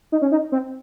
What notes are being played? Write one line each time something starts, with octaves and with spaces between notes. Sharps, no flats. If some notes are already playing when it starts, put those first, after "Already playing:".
D#4
C#4
D#4
C4